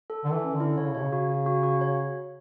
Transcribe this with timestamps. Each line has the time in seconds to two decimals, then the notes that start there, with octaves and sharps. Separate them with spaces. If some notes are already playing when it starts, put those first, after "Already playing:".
0.10 A4
0.24 D3
0.27 A4
0.32 E3
0.44 C#4
0.55 D3 E4
0.78 D3 C#5
0.86 C#3
0.95 B2 C#5
1.02 C#3
1.13 F#4
1.30 F#4
1.46 F#4
1.63 F#4
1.81 C#5